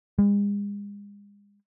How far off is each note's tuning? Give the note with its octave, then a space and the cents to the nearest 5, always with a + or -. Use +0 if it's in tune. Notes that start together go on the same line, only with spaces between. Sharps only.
G#3 -40